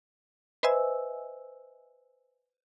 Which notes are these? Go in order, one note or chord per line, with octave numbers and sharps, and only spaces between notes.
B4 C5 D#5 E5 G#5 E6